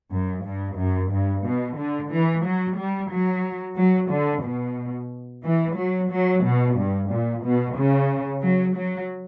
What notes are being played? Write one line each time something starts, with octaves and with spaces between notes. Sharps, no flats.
F#2
G2
F#2
G2
B2
D3
E3
F#3
G3
F#3
F#3
D3
B2
E3
F#3
F#3
B2
G2
A#2
B2
C#3
F#3
F#3